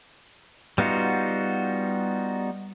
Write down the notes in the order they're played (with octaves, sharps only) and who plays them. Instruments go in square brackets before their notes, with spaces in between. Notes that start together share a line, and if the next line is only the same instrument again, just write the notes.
[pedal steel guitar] G3 B3 D#4 F4 F#4